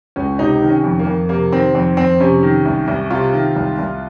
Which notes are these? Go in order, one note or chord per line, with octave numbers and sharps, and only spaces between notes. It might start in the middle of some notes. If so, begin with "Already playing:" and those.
C#2 C#4
C3 D#4
D#3
C#4
F2
A#3
F2
C3 A#3
D#3 C4
F2 C4
F2 C4
C3 C#4
D#3
C2
C2
C3 F4
D#3
C2
C2